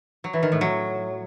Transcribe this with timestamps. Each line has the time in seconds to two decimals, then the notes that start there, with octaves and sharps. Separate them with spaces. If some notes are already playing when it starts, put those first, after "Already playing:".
0.24 F#3
0.33 E3
0.43 D#3
0.52 A2
0.61 F#3